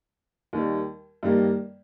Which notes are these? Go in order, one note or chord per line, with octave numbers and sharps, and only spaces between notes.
D#2 D#3 G3
G2 D#3 G3 A#3